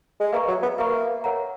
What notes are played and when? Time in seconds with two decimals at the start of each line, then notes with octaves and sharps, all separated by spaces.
0.20 G#3
0.33 A#3 B4 E5 A#5 C#6
0.48 F#3
0.62 B3
0.78 A#3 B4 E5 A#5 C#6
1.24 A#4 C#5 F#5 A#5